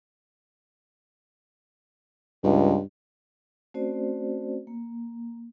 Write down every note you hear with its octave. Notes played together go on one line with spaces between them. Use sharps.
C#2 G2
A3 C4 C#4 F#4 C5 D5
A#3